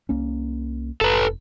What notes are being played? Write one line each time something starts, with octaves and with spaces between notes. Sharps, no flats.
C2 A#3 C#4
F1 A4 B4